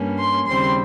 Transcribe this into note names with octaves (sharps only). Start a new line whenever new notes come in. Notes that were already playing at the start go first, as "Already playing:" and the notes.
Already playing: G2 G3 A#3 C#4
C6
D#2 C#3 G3 C4 C6